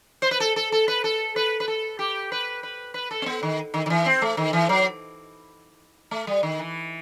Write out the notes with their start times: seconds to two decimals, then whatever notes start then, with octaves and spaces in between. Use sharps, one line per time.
0.22 C5
0.31 B4
0.40 A4
0.56 A4
0.72 A4
0.88 B4
1.04 A4
1.36 B4
1.60 B4
1.68 A4
1.99 G4
2.32 B4
2.63 B4
2.94 B4
3.11 A4
3.22 C4
3.26 B3
3.43 D#3
3.74 D#3
3.86 D#3
3.90 E3
4.06 C4
4.22 A3
4.37 D#3
4.53 E3
4.69 F#3
6.11 A3
6.27 G3
6.43 D#3
6.59 E3